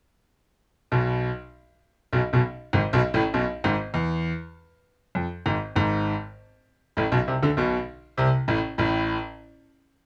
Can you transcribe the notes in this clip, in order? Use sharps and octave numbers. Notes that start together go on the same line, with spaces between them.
B1 B2
B1 B2
B1 B2
G#1 G#2
B1 B2
A1 A2
B1 B2
G#1 G#2
E2
F2
G#1 G#2
G#1 G#2
A1 A2
B1 B2
C2 C3
D2 D3
B1 B2
C2 C3
A1 A2
A1 A2